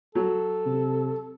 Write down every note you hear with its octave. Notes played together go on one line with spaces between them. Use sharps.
F#3 A4
C3